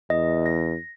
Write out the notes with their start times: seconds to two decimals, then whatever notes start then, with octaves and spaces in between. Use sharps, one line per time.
0.10 E2 D#5
0.46 A#6